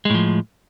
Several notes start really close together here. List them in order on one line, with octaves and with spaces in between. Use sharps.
G#3 A2 F3